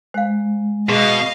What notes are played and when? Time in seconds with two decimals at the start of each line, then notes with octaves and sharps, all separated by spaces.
0.14 G#3 C5 F5
0.89 B2 G#4 D#5 F5 C6 D6